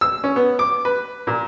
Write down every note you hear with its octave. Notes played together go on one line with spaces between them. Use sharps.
E6
C#4
B3
D6
B4
A#2